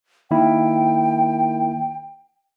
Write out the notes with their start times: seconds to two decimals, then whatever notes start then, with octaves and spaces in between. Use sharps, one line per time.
0.31 D#3 A#3 E4 G5